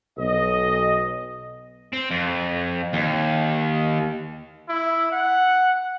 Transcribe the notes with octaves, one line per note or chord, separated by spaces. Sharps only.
B1 D#5
C4
F2
D#2
E4
F#5